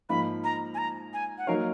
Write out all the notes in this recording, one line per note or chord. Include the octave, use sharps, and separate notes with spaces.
G#2 F3 A#3 D#4 B5
A#5
G#5
A#5
G#5
F#5
F#3 A#3 D#4 A#4 C#5 F5